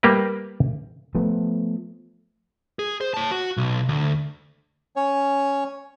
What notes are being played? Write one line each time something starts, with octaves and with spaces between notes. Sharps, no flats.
G3 A#3 G4 A#4 B4
F3 A3 B3
G#4
C5
C#5 A5
F#4
B1
D2
C#4 C#5